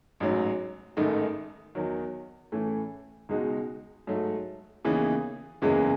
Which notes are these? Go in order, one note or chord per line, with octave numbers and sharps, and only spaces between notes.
A1 G#2 F#3
A1 G#2 D#3 A3 D#4
E2 D#3 F#3
A2 E3 A3 C#4
C#2 B2 G#3 D#4 F#4
G#2 F#3 A3
D#2 C#3 E3 B3 D#4
F#1 E2 C#3 E3 G#3